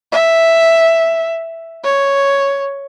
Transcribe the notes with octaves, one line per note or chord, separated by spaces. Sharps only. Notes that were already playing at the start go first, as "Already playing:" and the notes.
E5
C#5